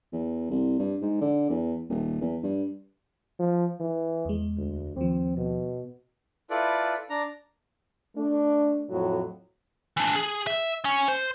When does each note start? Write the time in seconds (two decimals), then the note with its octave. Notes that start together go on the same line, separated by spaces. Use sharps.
0.12 E2
0.50 C2
0.79 G2
1.02 G#2
1.21 D3
1.50 E2
1.89 D#1
2.21 E2
2.43 G2
3.39 F3
3.80 E3
4.25 E2 G#3
4.57 D2
4.96 D#2 F3 C4
5.37 B2
6.50 E4 F4 A4 B4 D5
7.10 D4 A#5
8.16 A3 D4
8.90 F2 A2 F#3
9.97 E3 D4
10.16 G#4
10.47 E5
10.85 C#4
11.08 C5